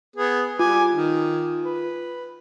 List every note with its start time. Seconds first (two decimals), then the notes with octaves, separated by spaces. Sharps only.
0.16 B3 G#4
0.59 G3 F4 G#5 D6
0.95 D#3
1.65 B4